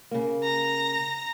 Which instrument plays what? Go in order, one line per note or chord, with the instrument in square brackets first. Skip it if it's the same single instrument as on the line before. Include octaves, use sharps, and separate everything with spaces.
[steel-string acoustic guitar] C#3 A#3
[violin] A#5